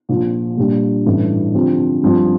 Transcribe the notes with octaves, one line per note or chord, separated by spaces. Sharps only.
A#1 A#2 F3
A#2 G3 D4 G4
A1 G2 E3 A3
D3 F3 C4 G4
G2 F3 C4